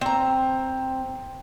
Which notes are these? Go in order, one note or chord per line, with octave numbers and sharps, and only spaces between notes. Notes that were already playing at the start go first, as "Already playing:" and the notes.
C4 A#5